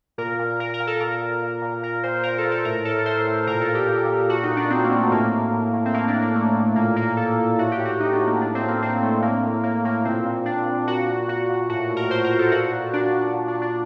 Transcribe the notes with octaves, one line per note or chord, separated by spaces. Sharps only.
A#2 A#4
A#2
A#2 A#4
A#4
A#2
A4
A#2 A#4
A#2
A#2
A#2
A#2 A#4
A#2 C5
A#2 A#4
A4
A#2
A4
A2 A#4
A2 A4
A2 C5
A2
A#2 A#4
A4
A#2
G4
A#2
A#2
A#2 F#4
D#4
A#2
D4
A#2 C4
A#3
A#2
A3
A2 A#3
A2
A2
A2
C4
A2 A#3
D4
A2
A#3
A2 A3
A2
A#2 A#3
A#2 A#3
A#2 A4
A#2
A2 F#4
G4
A2
F#4
A2 D#4
D4
A2
A#3
A2 D4
C4
A2
A#3
A2 C4
A2 A3
A2 A#3
A2
A2 A#3
A2 A#3
A#2 C4
A#2
A#2 D4
A#2
A#2 F#4
A#2
A#2 F#4
A#2
A2 F#4
A2
A#4
A2 C5
A#4
A2
A4
A#2 F#4
A#2
A#2 D4
A#2
A#2
D4
A#2
D4